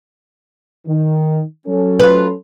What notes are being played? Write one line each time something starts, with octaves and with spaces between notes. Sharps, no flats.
D#3
F#3 C#4 A4
F4 B4